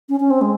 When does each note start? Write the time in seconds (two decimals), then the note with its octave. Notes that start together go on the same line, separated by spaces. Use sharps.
0.09 C#4
0.20 C#4
0.30 C4
0.41 G#3